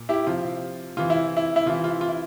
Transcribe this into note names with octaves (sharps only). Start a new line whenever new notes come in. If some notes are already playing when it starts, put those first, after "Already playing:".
Already playing: A#2
E4 G4
C3 F3 F4
C3 E3 F4
E4
E4
E4
C3 E3 F4
F4
F4
E4